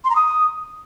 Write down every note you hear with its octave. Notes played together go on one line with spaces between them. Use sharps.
C6
A#5
D#6